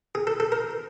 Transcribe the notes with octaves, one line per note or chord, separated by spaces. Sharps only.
G#4
A4
A4
A#4